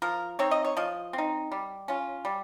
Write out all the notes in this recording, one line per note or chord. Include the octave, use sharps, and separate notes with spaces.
F3 A#4
C4 D#4 C#5
D#5
C#5
F3 D#5
C4
D#4
G3
C#4 F4
G3